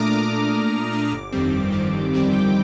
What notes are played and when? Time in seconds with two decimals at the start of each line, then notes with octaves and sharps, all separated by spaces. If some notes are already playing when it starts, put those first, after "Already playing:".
Already playing: A#2 A3 D4 A#5 D6 D#6 F6
0.12 A3 D4
0.32 A#2
0.52 A3 D4
0.72 A#2 D6
0.92 A3 D4
1.12 G1
1.32 F2 D#3 G3 C4
1.52 G1
1.72 F2 D#3 G3 C4
1.93 G1
2.12 F2 D#3 G3 C4
2.32 G1 G5